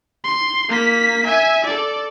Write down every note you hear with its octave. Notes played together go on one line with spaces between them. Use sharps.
C6
A#3 B6
E5 G#5
A4 D5